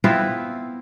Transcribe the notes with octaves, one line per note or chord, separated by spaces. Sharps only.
B3 C4 E4 F4